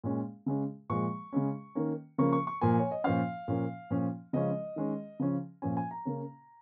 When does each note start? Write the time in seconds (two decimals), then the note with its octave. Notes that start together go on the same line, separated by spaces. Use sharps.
0.04 A#2 G#3 C#4
0.46 C#3 G#3 C#4
0.89 A#2 F3 G#3 C#6
1.33 C#3 G#3 C#4
1.75 D#3 A#3 C#4
2.18 C#3 F3 A#3 C#4 C#6
2.33 C#6
2.47 C#6
2.61 A#2 F3 A#3 G#5
2.79 C#5
2.91 D#5
3.04 A#2 F3 C#4 F5
3.48 A#2 F3 A#3 C#4
3.90 A#2 F3 C#4
4.33 C#3 F3 G#3 C#4 D#5
4.76 D#3 G#3 C#4
5.19 C#3 F3 C#4
5.62 A#2 F3 C#4 G#5
5.77 G#5
5.91 A#5
6.05 C#3 A#3 C#4